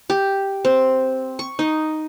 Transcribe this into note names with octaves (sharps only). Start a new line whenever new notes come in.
G4
C4
C#6
D#4